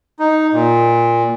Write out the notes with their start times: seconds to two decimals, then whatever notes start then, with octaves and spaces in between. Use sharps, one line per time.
0.19 D#4
0.53 A#2